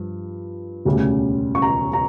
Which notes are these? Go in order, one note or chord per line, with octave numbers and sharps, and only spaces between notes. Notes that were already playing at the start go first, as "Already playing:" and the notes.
Already playing: G2 F3
E1 D2 C#3 G3
C#6
A#5
A#5